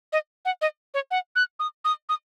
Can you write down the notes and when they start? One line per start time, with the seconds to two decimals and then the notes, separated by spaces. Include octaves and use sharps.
0.13 D#5
0.45 F#5
0.61 D#5
0.94 C#5
1.11 F#5
1.36 F#6
1.59 D#6
1.85 D#6
2.09 D#6